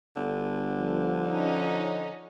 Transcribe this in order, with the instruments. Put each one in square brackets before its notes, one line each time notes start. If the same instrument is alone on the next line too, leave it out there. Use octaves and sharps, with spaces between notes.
[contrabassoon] G1 [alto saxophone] D3
[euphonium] F3
[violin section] C#4 D#4